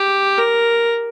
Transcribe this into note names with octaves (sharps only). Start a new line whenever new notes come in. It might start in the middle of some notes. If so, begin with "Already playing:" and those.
Already playing: G4
A#4